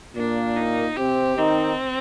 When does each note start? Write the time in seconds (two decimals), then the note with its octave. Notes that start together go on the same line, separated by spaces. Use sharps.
0.15 A#2 A#3 D4
0.56 D#4
0.96 C3 C4 G4
1.37 D#3 C4 D#4